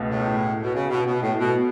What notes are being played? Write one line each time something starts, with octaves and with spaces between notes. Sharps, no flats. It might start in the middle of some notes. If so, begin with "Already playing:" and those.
Already playing: C#2 B2 A3
A2
B2
C#3
B2
B2
A2
B2